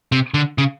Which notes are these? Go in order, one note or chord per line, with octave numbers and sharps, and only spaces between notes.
C3
D3
C#3